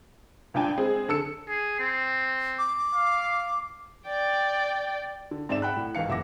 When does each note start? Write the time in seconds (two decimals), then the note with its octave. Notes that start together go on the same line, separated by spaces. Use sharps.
0.54 C#2 G2 D4 G5 G#5
0.78 G#3 C4 G#4
1.08 D3 A4 E6 C#7
1.48 G#4
1.79 C4
2.59 D6
2.94 F5
4.07 D5 G5
5.31 D3
5.49 G#2 C4 D5 E5 E7
5.62 F#5 G5 B5 F#6
5.77 A2
5.95 G#1 D#3 E3 F5 C#7
6.09 F#1 E5 F#5 D6 A#6